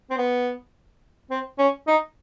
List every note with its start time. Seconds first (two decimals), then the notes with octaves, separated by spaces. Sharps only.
0.11 C4
0.18 B3
1.31 C4
1.59 C#4
1.88 D#4